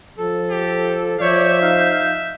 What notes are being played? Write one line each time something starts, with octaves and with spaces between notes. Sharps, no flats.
F3 A4
G4
F3 C#5 D5 E5 G6
D#4 F5